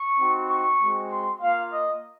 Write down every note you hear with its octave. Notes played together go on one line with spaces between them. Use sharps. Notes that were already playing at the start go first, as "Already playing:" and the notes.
Already playing: C#6
C4 D#4 F#4
C#6
G#3 C4 F#4
C6
A#3 F4 F5
D#5